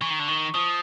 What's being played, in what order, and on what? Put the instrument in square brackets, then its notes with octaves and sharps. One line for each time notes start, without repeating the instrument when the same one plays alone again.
[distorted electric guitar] E3 [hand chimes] C#6
[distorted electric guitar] D#3
D3
[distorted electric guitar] D#3 [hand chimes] C#6
[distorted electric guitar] F3 [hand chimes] D#6